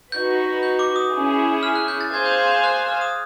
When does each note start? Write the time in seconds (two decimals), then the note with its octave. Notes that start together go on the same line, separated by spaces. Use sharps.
0.12 D#4 F#4 B4 G6
0.63 G6
0.79 D6
0.96 D#6
1.12 C#4 E4 G#4
1.63 F6
1.75 F#6
1.88 G6
2.01 A6
2.13 G#4 C5 F5 G#5 G#6
2.26 G6
2.38 G#6
2.51 G6
2.64 F#6
2.89 F6
3.01 D#6